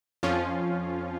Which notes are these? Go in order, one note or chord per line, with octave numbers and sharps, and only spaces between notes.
F2 F3 C#4 F4